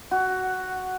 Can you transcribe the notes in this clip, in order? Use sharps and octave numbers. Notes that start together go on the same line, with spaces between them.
F#4